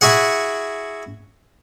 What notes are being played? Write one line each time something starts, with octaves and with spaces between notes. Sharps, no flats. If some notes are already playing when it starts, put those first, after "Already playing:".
E4 F#4 G#4 F#5